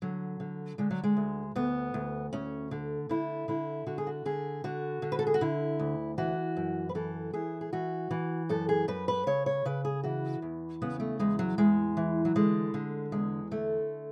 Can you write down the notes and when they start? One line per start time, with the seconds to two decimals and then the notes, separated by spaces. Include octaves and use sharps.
0.02 D3 F#3
0.40 D3
0.78 D3 G#3
0.90 F#3
1.04 G#3
1.17 D2
1.56 D2 B3
1.94 D2
2.33 D2 C#4
2.71 D3
3.09 D3 E4
3.48 D3 E4
3.86 D3 F#4
3.98 G#4
4.07 F#4
4.25 D3 G#4
4.64 D3 F#4
5.02 D3
5.12 B4
5.19 A4
5.27 G#4
5.34 F#4
5.41 D3 E4
5.79 D2
6.18 E3 F#4
6.57 F#2
6.89 B4
6.95 E3 A4
7.33 E3 G#4
7.61 G#4
7.73 E3 F#4
8.11 E3
8.49 F#2 A4
8.69 G#4
8.88 F#2 B4
9.08 B4
9.27 C#3 C#5
9.46 C#5
9.65 C#3 B4
9.85 G#4
10.04 E3 F#4
10.42 E2
10.82 C#3 B3
11.00 A3
11.20 E2 G#3
11.39 F#3
11.58 E2 G#3
11.97 E3
12.25 F#3
12.36 D3 G#3
12.74 D3
13.12 E2 G#3
13.51 D3 A3